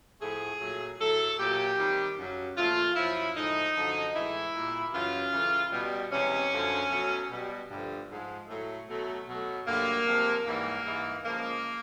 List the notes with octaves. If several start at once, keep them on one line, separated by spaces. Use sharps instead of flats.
A2 F3 A3 G#4
A#2 F#3 A3
A2 F#3 A3 A4
A#2 F#3 A3 G4
C3 D#3 G3
F#2 C#3 F#3
A#2 F3 A3 F4
F#2 C#3 F3 E4
A2 F3 G#3 D#4
F#2 D3 F3
A2 E3 G#3 E4
A#2 G3
F#2 C#3 E3 F4
C#3 E3 A3
B2 G3
C3 E3 G#3 C#4
F#2 D3 F3 A3
B2 F#3 A3
B2 G3
G2 D3 F3 A3
G#2 F3 G#3
A2 F#3 A3
B2 F#3 A3
B2 F#3 A3
G2 D3 F#3 A3 A#3
C3 F3 G#3
G#2 E3 G3 A#3
G#2 E3 G#3
C#3 F3 G#3 A#3